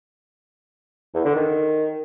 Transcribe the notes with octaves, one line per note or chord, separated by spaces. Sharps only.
E2
D3
D#3